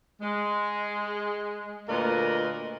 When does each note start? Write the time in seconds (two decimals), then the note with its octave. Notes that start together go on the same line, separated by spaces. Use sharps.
0.21 G#3
1.88 D2 A#2 A#3 A#4 B4 D#5